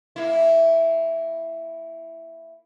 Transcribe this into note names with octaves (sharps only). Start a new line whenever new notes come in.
A#3 E4